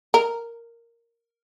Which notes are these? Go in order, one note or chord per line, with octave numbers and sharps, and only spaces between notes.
A#4